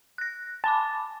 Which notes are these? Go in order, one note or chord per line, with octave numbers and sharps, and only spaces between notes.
F#6 A#6
G#5 A5 B5 D6